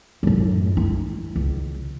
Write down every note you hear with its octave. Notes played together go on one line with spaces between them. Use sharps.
F#2 A2
D#4 E4
C#2